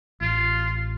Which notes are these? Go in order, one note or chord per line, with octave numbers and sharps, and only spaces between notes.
A1 F4